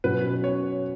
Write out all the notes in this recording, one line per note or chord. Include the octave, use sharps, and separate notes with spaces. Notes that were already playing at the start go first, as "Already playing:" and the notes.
B2 F#3 C#4 B4
C#5